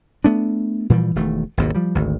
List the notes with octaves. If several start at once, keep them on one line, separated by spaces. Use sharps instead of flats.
A3 B3 D4
A#2 E3 F3 G3
E1 D#3 A3
G#1 D#2 B2
F3 G3
G#1 D2